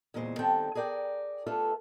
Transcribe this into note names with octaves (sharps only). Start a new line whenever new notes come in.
E2 A#2 C#3 G#3 C5
D#3 G3 C4 A4 G5 A5
G#4 A#4 D5 F#5 G5
A3 F4 G4 A4 B4 E5